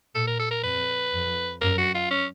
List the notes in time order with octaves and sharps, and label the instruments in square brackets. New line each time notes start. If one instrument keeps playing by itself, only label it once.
[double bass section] A#2 [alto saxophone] A4
[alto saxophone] A#4
A4
A#4
[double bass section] F2 [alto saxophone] B4
[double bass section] F2
[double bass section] F#2 [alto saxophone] A#4
[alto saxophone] F#4
F4
C#4